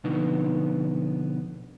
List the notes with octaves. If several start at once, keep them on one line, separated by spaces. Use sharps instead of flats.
B2 D3 F3 B3 D#4